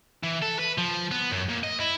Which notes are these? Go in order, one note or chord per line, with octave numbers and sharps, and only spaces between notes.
E3
A4
B4
F3
B3
F#2
A#2
D#5
E4